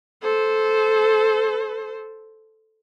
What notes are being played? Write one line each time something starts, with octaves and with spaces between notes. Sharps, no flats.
A4 C5